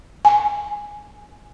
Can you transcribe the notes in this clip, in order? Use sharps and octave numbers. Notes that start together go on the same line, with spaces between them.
G#5